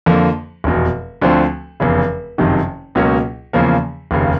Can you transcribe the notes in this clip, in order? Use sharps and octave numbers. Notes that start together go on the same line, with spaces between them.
F2 D3 F3 A#3
F1 E2 B2
D2 D3 F3 A3 C4
F1 E2 C#3
F#1 F2 C3 D#3
C#2 B2 F#3 A#3 C#4
E2 C#3 F3 A#3
F1 D#2 C#3